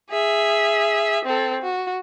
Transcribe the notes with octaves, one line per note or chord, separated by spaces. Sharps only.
G#4 E5
C4 A4
F#4